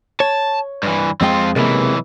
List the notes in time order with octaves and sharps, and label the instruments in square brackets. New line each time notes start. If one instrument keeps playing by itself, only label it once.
[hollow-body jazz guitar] C#5 [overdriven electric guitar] A5
[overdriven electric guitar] G2 E3
[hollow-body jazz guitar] F2 G#3 G5 [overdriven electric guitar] C4 F4
[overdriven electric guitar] B1 E3 [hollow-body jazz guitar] C3 G#3 A#3